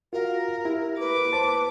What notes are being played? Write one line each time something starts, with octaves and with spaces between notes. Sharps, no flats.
F4 F#4 A#4 F5
E4 G4
B4 D6
C5 A5